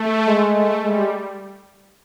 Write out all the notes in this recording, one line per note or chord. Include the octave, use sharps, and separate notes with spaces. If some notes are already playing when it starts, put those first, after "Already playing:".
Already playing: A3
G#3
A3
G3 G#3